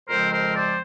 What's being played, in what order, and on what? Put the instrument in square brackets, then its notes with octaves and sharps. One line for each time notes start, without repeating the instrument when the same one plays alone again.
[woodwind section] F2 C#3 F3 G#3 C4 A#4 C5
A#4 C5
C5 D5